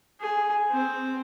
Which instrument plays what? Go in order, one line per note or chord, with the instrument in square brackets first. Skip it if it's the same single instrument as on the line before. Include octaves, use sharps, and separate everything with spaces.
[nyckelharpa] G#4
C4